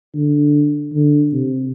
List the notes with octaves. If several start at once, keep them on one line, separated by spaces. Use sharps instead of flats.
D3
D3
C3